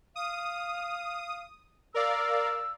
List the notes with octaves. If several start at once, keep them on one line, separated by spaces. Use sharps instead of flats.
F5 D#6
A#4 D5 F5 E6